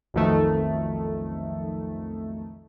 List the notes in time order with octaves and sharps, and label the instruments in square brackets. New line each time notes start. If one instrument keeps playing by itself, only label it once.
[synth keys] B1 F2 D#3 A3